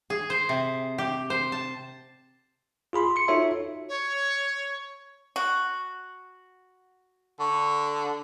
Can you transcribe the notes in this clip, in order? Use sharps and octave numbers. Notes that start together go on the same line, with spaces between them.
G#4
C5
C3
G4
C5
A5
F4 G#4 B5 C6
C6 C#7
D#4 F4 F#4 A4 C#5 E5
C#5
F#4
D3 C#6